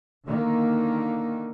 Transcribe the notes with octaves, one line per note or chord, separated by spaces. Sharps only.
D3 D#3 A#3